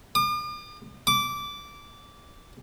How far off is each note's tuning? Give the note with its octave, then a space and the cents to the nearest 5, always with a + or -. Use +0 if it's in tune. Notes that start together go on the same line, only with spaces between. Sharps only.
D6 +45
D6 -15